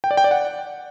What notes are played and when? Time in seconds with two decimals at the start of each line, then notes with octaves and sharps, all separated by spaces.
0.04 G5
0.11 D5
0.17 G5
0.24 D5
0.31 F#5